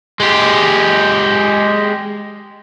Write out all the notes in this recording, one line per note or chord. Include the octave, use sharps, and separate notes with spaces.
G#3 G4